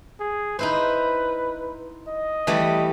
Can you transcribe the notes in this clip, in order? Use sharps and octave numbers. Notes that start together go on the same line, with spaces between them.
G#4
D#4 E4 B4 C5
D#5
E3 G3 A3